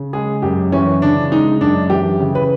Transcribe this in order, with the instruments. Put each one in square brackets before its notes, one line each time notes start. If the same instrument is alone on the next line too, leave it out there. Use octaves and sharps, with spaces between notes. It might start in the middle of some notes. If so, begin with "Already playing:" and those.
Already playing: [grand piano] C#3
G#3 G#4
F#2 G4
E3 C#4
C#3 D4
G#3 D#4
F#2 D4
E3 G4
C#3
B4